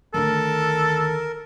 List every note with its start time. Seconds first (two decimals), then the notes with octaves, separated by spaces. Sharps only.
0.14 D2 D#3 A4 A#4